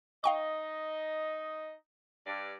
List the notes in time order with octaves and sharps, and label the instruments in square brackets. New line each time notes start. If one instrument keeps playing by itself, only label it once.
[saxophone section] D#4 D#5 [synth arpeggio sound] F5 G5 C#6
[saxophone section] G2 D5